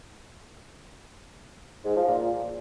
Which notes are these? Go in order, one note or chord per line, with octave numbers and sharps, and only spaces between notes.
G#2
F3
A#2